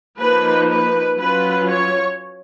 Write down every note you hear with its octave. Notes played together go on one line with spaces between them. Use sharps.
F3 A#3 D#4 B4
B4
F#3 C#4 F4 B4
C#5